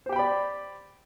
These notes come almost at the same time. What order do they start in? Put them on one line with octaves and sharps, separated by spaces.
C5 G4 G5 B5 D5